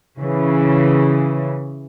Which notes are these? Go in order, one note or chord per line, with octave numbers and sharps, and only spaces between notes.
C#3 E3